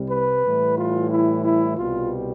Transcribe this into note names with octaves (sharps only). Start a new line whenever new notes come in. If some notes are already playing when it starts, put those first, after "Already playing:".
Already playing: C2 C3 G3
B4
A2 E3 G3
F4
E4
E4
C2 B2 G3 F4